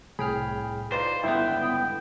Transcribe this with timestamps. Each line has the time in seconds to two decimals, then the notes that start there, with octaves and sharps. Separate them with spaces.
0.19 C2 A2 G#4 G5 B5 F6
0.92 D#4 F4 B4 C5 D5
1.24 C#2 G2 D3 B3 E4 G5